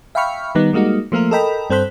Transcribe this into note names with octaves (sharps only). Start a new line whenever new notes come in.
E5 F5 G5 B5 C#6 F6
D#3 G3 B3 D#4
G3 G#3 A#3 D#4 F#4
F3 A3 A#3 F4 A#4
A4 A#4 D#5 G5 B5
G2 C4 A4 C5 F#6 B6